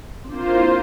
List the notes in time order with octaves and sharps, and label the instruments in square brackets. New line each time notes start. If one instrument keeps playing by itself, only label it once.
[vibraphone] C4
[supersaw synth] A#3 F4 C5 [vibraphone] D4
[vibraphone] E4